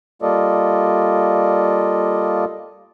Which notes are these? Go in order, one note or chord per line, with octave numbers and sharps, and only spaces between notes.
G3 A#3 F4 A4 D5 D#5